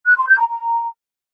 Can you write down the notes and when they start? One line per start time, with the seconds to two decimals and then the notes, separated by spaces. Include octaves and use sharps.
0.06 F#6
0.17 C6
0.28 G6
0.38 A#5
0.49 A#5